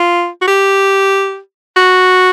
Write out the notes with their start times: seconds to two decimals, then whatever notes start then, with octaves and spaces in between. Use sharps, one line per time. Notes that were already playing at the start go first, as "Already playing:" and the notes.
Already playing: F4
0.42 F#4
0.48 G4
1.77 F#4